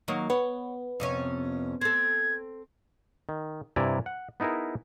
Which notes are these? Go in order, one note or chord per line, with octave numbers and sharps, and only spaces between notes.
D#3 F#3 A#3
B3 C#5
F2 C3 C#4
C4 A4 G#6
D#3
G2 C3 E4 D5 G#5 A#5
F#5
B3 D#4 E4 G#4 A#4